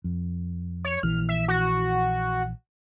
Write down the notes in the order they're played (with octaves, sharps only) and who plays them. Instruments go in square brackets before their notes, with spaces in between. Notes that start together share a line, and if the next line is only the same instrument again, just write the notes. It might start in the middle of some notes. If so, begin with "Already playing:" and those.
[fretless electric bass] F2
[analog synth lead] C#5
[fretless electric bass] A#1 E3 [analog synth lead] F6
[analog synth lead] E5
F#4